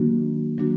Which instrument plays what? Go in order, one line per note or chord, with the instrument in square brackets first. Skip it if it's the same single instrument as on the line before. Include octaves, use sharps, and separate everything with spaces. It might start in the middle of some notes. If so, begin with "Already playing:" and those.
Already playing: [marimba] D#3 F#3 A#3 D4 F#4
D#3 F#3 A#3 D4 F#4